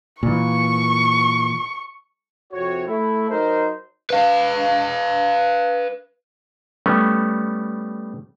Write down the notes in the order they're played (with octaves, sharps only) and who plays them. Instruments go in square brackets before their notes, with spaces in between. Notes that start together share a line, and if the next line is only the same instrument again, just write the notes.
[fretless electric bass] A#2 E3 [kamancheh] C#6
[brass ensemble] F2 C3 F#4 C#5
A3 E4
F#3 D#4 A#4 C5
[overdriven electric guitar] B4 F5
[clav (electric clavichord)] G3 A3 B3 C#4